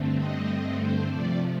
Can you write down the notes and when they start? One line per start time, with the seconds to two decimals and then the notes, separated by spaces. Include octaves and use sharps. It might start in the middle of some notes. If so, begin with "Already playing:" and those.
Already playing: G2 D3 A3 C4
0.19 D#5
0.79 C5
1.09 C3 F3 A3 D5